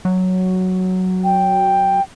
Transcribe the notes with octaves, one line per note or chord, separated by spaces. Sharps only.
F#3
G5